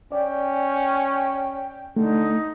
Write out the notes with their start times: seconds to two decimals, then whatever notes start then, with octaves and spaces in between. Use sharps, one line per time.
0.12 C#4 D5 G5
1.96 D3 A3 D#4